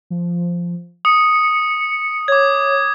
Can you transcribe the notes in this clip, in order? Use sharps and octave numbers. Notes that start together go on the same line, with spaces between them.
F3
D#6 C#7
C#5 D6 G#6